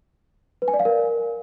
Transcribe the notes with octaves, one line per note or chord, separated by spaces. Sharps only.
B4
G#5
D5
F5
A#4